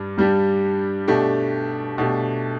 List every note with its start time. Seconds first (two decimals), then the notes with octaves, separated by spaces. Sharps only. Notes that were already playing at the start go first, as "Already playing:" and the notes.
Already playing: G2 G3 D4
0.18 G2 G3 D4 G4
1.08 B2 A3 D4 G4
1.98 B2 A3 D4 G4